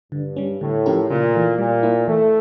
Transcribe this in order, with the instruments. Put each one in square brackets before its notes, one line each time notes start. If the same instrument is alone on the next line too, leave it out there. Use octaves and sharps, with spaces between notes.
[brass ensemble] G2 [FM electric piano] D3
[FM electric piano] G3 C#4
[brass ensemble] A2 [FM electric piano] D3
[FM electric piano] F3 C#4 G4 A#4
[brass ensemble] A#2 [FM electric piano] C#3
[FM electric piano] E3 A3
[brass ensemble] A#2 [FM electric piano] G3
[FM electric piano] A#3 E4
[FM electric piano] E3 [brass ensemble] A3